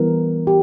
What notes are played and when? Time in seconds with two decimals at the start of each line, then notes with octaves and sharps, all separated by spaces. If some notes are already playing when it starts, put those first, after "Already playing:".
Already playing: E3 G3 B3 A#4
0.47 G4